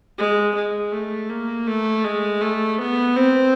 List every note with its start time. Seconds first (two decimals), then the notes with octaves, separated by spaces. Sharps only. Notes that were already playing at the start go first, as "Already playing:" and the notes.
0.18 G#3
0.55 G#3
0.92 A3
1.30 A#3
1.67 A3
2.04 G#3
2.41 A3
2.78 B3
3.16 C4